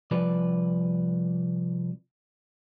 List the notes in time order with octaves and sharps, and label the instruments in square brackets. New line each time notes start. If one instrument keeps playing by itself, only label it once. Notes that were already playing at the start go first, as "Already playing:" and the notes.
[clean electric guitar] C2 F3 B4 D5